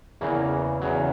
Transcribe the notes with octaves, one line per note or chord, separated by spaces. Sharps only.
E2 C#3 E3 A#3
E2 C#3 F#3